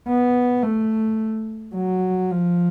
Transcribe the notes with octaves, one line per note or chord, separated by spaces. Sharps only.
B3
A3
F#3
F3